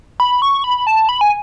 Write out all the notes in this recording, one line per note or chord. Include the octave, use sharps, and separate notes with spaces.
B5
C#6
B5
A5
B5
G#5